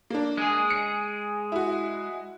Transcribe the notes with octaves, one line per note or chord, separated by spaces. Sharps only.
A#3 D4
G#3 G#4
C#7
E4 F#4